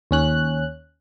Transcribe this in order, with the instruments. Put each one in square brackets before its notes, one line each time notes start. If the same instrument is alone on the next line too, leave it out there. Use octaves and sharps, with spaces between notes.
[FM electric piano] D#2 C#4 F#6